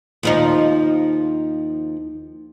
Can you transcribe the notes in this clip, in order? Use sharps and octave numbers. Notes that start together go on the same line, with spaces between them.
D#2 F3 D#4